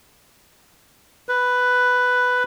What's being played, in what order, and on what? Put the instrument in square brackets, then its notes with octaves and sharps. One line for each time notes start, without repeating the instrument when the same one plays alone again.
[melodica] B4